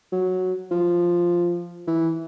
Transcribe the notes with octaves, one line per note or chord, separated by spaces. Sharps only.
F#3
F3
E3